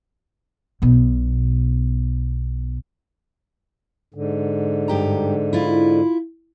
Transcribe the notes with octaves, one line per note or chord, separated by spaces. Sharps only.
B1 B2
G#2 D3
G2 G4 A#5
E4 F4